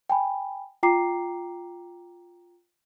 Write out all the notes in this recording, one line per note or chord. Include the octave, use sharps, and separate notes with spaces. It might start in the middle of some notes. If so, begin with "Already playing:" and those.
G5 G#5 B5
F4 G5 A#5 D6 C7